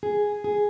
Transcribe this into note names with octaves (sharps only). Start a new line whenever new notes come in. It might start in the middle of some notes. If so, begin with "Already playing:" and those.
G#4
G#4